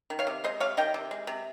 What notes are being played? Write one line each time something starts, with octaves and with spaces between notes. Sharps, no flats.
D#3
C#5 F5
C3
G#3 C5 D#5
C3 C#5 F5
D#3 D#5 G5
C3
G#3
C3